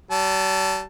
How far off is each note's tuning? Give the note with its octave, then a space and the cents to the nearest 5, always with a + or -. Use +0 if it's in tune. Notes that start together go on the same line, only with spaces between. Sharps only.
G3 -45 A5 +0